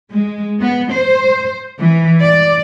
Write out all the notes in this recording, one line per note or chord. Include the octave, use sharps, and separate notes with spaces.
G#3
B3
C5
E3
D5